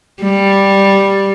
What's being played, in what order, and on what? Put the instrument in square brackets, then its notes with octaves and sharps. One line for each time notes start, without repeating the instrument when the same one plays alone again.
[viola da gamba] G3